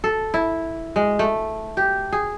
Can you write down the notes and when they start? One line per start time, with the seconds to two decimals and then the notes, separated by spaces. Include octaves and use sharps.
0.04 A4
0.34 E4
0.96 G#3
1.19 A3
1.77 G4
2.12 G#4